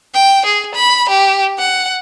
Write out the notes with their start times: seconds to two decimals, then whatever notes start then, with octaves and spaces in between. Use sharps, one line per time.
0.14 G5
0.45 G#4
0.74 B5
1.09 G4
1.59 F#5